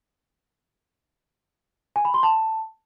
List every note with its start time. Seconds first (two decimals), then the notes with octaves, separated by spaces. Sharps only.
1.96 G#5
2.05 B5
2.14 C6
2.23 A5